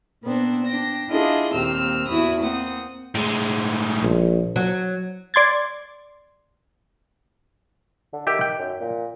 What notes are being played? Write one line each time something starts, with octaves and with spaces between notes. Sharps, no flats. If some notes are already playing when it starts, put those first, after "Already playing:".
A#2 B3 C4 D4
D4 G5 A#6
D4 E4 F4 G#4 A4 D#5
D#2 A#2 C4 G4 E6 F6
E2 E4 F#4 B5 D#6
A#3 C4 F#5 D#6
A2 G#3
A#1
F#3
D5 C6 G#6 A6
D3
D#3 G4 E5 G5
G5
F#2
A#2